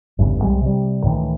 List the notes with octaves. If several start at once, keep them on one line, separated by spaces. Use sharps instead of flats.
G1 E2 A2 C#3
C2 G3 G#3
C3 G3
C#2 A2 D#3 E3